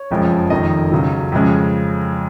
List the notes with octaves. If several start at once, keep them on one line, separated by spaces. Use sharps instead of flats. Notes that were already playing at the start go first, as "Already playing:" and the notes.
Already playing: C#5
F#1 F2 F3 G#3
F1 F2 D#3 D#5
C#2 C#3 F#3
F2 C#3 G#3